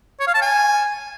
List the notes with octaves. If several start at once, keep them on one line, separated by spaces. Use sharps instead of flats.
C#5
F5
A5
G#5